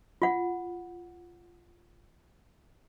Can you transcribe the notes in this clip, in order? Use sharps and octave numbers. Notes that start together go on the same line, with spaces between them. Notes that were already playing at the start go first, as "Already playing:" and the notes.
F4 F#5